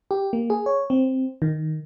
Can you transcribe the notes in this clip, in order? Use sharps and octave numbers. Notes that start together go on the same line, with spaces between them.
G4
A#3
G#4
C#5
C4
D#3